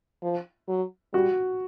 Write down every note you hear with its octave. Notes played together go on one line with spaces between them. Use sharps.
F3
F#3
G3 F#4